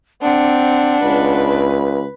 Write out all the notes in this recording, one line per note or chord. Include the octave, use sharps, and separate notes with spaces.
C4 D4 F#5
C#2 B4